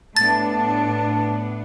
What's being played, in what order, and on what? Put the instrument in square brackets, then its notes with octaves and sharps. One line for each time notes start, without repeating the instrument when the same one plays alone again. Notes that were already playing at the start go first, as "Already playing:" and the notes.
[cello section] A2 B3 D4 [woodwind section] A5 [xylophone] A6